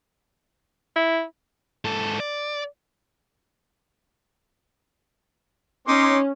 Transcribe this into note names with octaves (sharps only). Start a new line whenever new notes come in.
E4
G#2 A4
D5
C#4 D#4 C6 D6